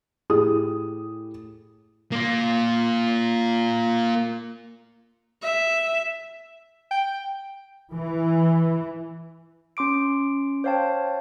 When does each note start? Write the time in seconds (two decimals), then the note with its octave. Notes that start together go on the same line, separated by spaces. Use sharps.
0.30 A2 G4 G#4 D#6
2.12 A#3 F4
5.43 E5
6.91 G5
7.94 E3
9.77 C#4 C6 D6 D7
10.64 C5 C#5 F5 G5 A5